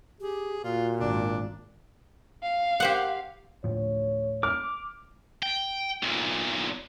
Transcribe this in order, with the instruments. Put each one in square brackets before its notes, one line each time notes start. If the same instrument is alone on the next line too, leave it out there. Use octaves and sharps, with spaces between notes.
[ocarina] G4 [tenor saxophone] G#4
[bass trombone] A#2 [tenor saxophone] F4 [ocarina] F#4
[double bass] G#1 [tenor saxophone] D4
[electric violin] F5
[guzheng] G4 C5 F#5
[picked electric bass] D2 A2 F3 [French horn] C#5
[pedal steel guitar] D6 [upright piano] F6
[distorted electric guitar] G5
B1 A#2